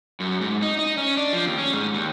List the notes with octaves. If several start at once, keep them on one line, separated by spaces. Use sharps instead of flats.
F#2
G#2
D#4
D#4
C#4
D4
F3
D#2
C#4
G#2
D#2